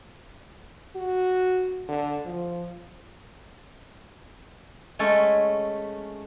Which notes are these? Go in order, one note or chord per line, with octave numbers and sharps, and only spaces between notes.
F#4
D3
F3
G#3 A3 C#4 A4